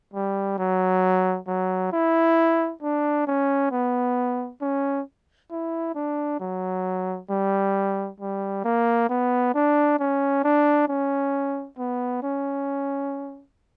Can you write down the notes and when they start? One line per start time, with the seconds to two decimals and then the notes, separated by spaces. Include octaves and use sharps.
0.13 G3
0.58 F#3
1.47 F#3
1.92 E4
2.82 D4
3.27 C#4
3.72 B3
4.61 C#4
5.51 E4
5.95 D4
6.40 F#3
7.30 G3
8.20 G3
8.64 A#3
9.09 B3
9.54 D4
9.99 C#4
10.44 D4
10.88 C#4
11.78 B3
12.23 C#4